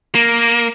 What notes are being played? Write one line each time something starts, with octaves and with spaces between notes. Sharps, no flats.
A#3